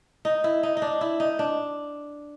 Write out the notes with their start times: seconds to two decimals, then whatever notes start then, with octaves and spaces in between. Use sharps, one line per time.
0.25 D#4
0.44 E4
0.63 D#4
0.77 D#4
0.82 D4
1.01 E4
1.20 D#4
1.39 D4